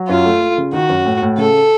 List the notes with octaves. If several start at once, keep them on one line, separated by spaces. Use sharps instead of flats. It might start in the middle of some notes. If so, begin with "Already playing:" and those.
Already playing: F#3
F#2 F4
A3
A3
C#3
D#3 F#4
F#2
A2
A2
C#3 A4